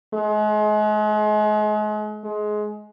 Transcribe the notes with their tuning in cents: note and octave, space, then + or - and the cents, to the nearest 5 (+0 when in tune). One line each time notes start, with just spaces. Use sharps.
G#3 +35
G#3 +20